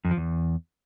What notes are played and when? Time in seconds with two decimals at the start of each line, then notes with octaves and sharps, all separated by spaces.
0.05 F2
0.11 F3
0.17 E2